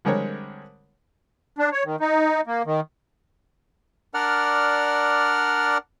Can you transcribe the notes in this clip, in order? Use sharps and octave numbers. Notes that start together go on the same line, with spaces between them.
D3 G3 G#3 C4 A#4 C#5
D4
C#5
D#3
D#4
A#3
D#3
D4 A#4 D5 F#5 F6